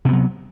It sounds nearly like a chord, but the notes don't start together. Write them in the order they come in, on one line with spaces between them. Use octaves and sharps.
C3 B3 F#3